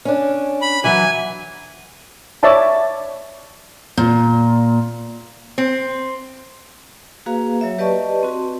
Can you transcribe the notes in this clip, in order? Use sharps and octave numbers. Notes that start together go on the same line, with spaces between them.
C#4 D4
B5
E3 F#3 G#5
C#5 D5 E5 A5 B5
A#2
C4
A#3 F#4 G#4 B4 F5 A#5
F#3 C#5 E5
G4 B4 D5 D#5 A5 C#6
C4 F#4